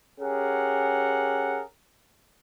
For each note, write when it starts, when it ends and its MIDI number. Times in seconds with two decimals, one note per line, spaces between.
0.20 1.61 61
0.20 1.61 67
0.20 1.61 68
0.20 1.61 70
0.20 1.61 78